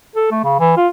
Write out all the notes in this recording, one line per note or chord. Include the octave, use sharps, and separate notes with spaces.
A4
A3
C#3
E3
F4